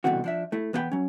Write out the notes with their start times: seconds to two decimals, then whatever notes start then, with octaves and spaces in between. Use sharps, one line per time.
0.04 C2 B2 D3 E3 C4 F#4
0.24 F3 D4 E5
0.52 A3 E4
0.73 E2 B3 D#4 F#4 G5 B5
0.91 F#3 C#4